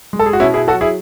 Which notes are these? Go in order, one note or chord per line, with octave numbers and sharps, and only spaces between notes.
G#3
A4
G#4
F#4
B2 C#4 E4
E4 G#4
F#3 F#4 A4
E4 G#4